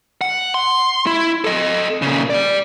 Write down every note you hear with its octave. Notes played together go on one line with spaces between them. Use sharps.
F#5
C6
E4
A4 D#5
A#2 C#3
G4 D5